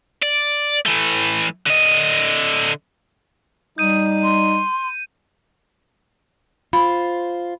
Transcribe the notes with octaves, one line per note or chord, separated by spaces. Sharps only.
D5
E3 A3
D3 D#5
G3 D#4 D#6 G6 D#7
C6
F4 C5 B5